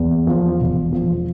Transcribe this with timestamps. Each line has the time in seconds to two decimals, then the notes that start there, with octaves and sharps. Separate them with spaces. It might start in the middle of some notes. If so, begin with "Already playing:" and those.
Already playing: E2
0.27 F3
0.60 E1
0.93 F3